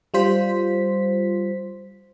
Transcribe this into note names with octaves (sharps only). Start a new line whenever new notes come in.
G3 F4 C5 B6